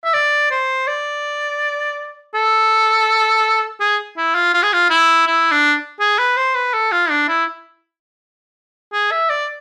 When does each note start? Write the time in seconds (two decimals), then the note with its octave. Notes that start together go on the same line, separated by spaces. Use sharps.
0.04 E5
0.14 D5
0.51 C5
0.87 D5
2.34 A4
3.80 G#4
4.17 E4
4.35 F4
4.54 F4
4.63 G#4
4.73 F4
4.90 E4
5.27 E4
5.52 D4
6.00 G#4
6.19 B4
6.37 C5
6.55 B4
6.74 A4
6.92 F4
7.10 D4
7.28 E4
8.93 G#4
9.11 E5
9.30 D5